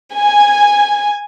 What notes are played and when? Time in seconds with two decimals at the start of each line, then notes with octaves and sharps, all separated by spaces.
0.15 G#5